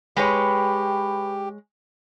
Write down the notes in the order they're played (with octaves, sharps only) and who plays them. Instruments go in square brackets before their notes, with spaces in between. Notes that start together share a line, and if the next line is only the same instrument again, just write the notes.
[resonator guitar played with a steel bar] G#3 C#5 [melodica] G4 [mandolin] B4 G5 B5